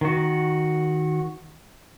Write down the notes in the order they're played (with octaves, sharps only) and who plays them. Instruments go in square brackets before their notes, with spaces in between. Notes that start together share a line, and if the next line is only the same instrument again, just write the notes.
[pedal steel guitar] D#3 F#4